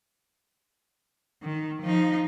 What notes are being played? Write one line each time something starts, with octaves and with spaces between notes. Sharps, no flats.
D#3
F3 D#4